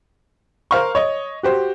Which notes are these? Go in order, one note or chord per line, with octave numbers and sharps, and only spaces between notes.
A#4 C5 F5 C#6
C#5 D#5
F#4 G4 C5